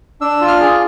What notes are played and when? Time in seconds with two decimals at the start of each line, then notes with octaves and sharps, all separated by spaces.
0.21 D4 E6
0.41 F4
0.48 F6
0.60 G#4